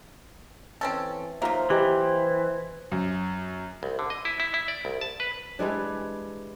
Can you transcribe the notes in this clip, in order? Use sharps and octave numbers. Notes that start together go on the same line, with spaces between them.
E3 C4 C#4 A4
F#3 A#3 D#4 F4 C5 E5
E3 G4 D#5
F#2
C2
D3
D#5
E4
E4
E4
D5
C2
A5
B4
E3 G3 G#3 D4